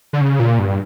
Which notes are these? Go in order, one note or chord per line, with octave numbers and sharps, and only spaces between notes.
D3
C#3
A#2
G2